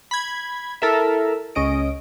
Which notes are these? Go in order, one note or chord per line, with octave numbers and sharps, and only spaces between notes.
B5 G#6
E4 A4 A#4 E5
C#2 C#4 D#5 D7